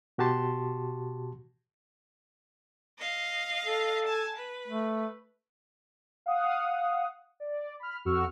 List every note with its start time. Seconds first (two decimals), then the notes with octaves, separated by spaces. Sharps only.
0.18 B2 F#4 G4 A5 C6
2.99 D#5 F5
3.65 A4
4.06 G#5 A5
4.36 B4
4.68 A3
6.26 F5 F#5 D#6
7.40 D5
7.80 B5 F6
8.05 F2 F#4 C#6 E6 F6